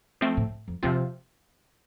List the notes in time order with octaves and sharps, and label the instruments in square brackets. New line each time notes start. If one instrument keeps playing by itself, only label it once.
[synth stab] F3 A3 C4
[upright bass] A2
F2
[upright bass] F2 [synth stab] C3 F3 C4 F4